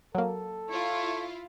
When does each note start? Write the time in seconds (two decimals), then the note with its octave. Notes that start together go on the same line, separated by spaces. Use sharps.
0.15 F#3 A#3 A4
0.70 E4 F4 C#5